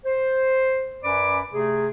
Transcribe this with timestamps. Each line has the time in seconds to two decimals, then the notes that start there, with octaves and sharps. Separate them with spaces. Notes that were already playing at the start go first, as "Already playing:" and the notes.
0.06 C5
1.04 F#2 C#4 B4 D5 B5 D6
1.53 C3 A3 G#4